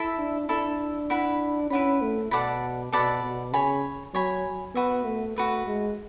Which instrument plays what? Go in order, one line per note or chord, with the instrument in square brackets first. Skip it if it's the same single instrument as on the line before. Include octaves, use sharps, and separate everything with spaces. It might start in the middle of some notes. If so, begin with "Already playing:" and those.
Already playing: [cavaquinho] E4 A4 E5
[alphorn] D4
[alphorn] D4 [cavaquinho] E4 A4 E5
[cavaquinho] E4 B4 F#5 B5
[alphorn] C#4 [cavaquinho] E4 B4 F#5 B5
[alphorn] A3
[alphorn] B2 [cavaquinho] A4 D5 F#5 B5
[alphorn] B2 [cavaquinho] A4 D5 F#5 B5
[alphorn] B2
[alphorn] C#3 [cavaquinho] C#5 G#5 B5
[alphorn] F#3 [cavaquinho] C#5 G#5 B5
[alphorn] B3 [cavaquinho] F#4 B4 E5
[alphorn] A3
[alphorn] A3 [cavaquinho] F#4 B4 E5
[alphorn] G#3